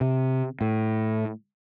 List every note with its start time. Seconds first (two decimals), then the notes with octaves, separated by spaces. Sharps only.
0.01 C3
0.61 A2